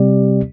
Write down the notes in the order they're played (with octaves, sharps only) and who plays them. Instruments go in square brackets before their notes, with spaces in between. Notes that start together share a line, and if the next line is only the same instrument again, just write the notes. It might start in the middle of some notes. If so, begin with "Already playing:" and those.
Already playing: [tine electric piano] C3 G3 C4 G4 D5